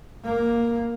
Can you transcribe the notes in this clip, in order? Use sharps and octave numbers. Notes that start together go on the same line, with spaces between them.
A#3